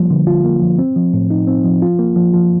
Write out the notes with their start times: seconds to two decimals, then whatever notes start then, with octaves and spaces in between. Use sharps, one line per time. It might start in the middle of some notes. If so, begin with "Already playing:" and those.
Already playing: F3 G3 A#3
0.10 D3
0.27 F4
0.44 A#3
0.62 F3
0.78 C4
0.96 F3
1.14 A2
1.31 D#4
1.47 C4
1.65 F3
1.82 F4
1.99 A#3
2.16 F3
2.33 F3